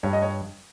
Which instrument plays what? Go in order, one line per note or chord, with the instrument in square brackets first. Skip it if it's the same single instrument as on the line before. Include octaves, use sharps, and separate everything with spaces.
[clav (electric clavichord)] G2 [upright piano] C#5
[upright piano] D#5
C#5